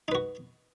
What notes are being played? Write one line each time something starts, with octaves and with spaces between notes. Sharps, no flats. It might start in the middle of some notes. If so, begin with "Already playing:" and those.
D#4 F#4 B4